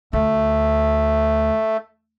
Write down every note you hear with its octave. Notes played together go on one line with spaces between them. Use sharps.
D2 A3